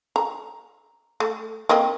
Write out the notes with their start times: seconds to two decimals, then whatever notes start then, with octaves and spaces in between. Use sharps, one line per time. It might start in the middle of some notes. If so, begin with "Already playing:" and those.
0.16 A#5
1.20 A3
1.69 A#3 C4 D#5